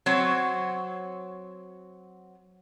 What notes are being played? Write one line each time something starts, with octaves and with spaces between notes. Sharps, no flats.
F#3 C4 C#5